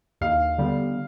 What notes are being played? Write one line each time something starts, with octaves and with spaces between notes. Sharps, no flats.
D#2 F5
D3 G3 B3